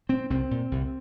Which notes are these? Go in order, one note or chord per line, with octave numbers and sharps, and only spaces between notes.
A#2 C4
C2 C4
A#2
C2